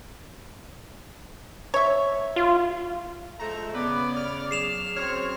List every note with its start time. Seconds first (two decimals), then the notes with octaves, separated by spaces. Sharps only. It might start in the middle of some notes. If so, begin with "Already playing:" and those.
1.74 C#5 E5
2.36 F4
3.39 F3 G#3 A3 A#5
3.74 C#3 B3 B4 D5
4.17 F6
4.51 F#3 G#4 C7 E7 F7
4.96 F#2 C4 C#5 F6